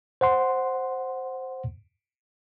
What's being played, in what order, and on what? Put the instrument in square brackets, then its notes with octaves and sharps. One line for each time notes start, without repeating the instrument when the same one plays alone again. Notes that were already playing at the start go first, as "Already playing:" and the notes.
[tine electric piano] C5 F#5 C6